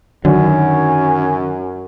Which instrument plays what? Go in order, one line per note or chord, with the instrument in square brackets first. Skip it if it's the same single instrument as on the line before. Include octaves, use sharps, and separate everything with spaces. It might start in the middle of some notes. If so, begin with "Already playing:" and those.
[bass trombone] F#2 [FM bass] D3 [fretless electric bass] D#3 F#3 [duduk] C#4